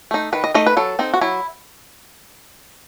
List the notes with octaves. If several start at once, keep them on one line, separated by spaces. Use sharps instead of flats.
A3 D#4
D#3 B4
D#5
A3 D#4 D#5
B4
F#3 A4
C4 D#4
F#4
F#3 E4